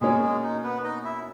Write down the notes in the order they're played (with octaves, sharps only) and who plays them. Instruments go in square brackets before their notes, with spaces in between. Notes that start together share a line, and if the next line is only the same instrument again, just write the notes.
[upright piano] B2 A#3 C#4 [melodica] G#3 G#4
[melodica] G#3 G#4
D#4
B3 B4
D#4 D#5
E4 E5